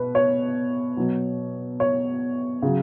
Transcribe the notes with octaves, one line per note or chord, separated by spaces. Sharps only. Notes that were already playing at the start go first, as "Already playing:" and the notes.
Already playing: B2 B4
C#5
B2 F#3
C#5
C#3 F#3